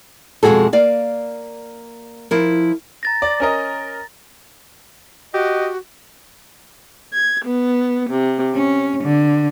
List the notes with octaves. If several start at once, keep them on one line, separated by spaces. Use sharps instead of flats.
F2 B2 G#3 F#4 G#4 A4
A#3 D5 F5
F3 E4 A#4
A#5 A6 A#6
D5
C#4 A#4 D#5
F#4 G4 D#5
G#6
B3
C3
C#4
D3